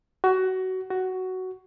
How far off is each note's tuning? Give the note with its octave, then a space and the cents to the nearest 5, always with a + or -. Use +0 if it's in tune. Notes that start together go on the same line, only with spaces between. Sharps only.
F#4 +20
F#4 +10